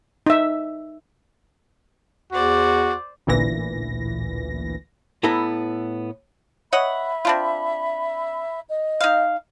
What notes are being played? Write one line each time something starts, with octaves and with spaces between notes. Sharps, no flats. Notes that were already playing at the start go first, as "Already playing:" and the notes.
D#4 E5
E2 F#4 C5 D5
A1 D2 A#2 E3 A#6
A2 B3 E4 A4 B4 A#5
C#5 D#5 E5 F#5 B5
C4 D4 F4
D#5
D#4 F5